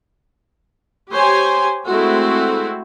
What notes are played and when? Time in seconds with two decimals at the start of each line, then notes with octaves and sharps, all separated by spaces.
1.12 G4 C5 C#5 G#5
1.87 G#3 A3 C4 E4 F#4 A4